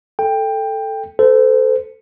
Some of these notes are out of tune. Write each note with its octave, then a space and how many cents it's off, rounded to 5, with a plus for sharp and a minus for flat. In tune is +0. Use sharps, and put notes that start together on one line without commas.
A4 +0 G5 +15
A4 +0 C5 -30